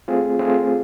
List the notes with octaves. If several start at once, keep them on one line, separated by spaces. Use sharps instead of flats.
A3 C4 F4 G#4
A3 C4 F4 G#4